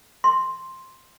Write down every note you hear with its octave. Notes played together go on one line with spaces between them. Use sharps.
C6